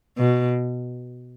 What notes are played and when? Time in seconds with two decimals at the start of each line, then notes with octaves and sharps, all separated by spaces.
0.17 B2